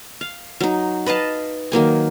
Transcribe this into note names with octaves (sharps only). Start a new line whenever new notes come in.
F5
F#3 D#4
B4 D#5 F5 A5
D#3 F#3 A#3 G#5